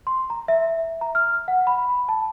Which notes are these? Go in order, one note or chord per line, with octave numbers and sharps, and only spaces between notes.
C6
A#5
E5
A#5
F6
F#5
B5
A5